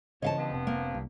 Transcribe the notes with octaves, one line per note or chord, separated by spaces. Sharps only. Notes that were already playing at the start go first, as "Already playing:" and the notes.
F2 C#3 E3 C#5 D#5 F5 A5
G2 F3 B3
F1 C3
A#3
C2